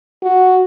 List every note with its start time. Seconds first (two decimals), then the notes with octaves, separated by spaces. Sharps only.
0.23 F#4